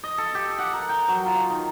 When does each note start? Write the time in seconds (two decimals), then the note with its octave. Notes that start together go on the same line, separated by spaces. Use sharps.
0.04 D#5
0.18 A4
0.35 G4
0.58 F#5
0.73 A#4
0.89 G5
1.08 F#3
1.26 F4
1.50 D#3